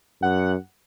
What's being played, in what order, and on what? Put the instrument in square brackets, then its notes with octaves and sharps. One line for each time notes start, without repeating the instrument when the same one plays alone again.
[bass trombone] F#2 [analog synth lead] F#5